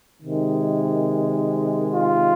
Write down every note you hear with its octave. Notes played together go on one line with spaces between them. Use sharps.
C3 D#3 G#3
F4